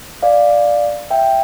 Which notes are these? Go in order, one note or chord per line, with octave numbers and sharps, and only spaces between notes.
D5 F5
E5 G5